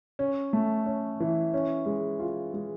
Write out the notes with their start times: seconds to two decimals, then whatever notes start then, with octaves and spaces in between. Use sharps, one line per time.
0.19 C#4
0.53 A3
0.86 C#4
1.20 E3
1.54 C#4
1.86 G#3
2.19 F4
2.54 G#3